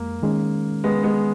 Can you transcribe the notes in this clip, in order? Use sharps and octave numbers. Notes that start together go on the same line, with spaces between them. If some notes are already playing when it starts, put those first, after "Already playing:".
Already playing: F2 G#3 A#3
D#3 G#3 C#4
G#3 B3
G#3 B3